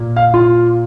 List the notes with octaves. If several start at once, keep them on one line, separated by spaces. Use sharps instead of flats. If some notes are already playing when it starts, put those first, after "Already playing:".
Already playing: A#2 A#3
F5
F4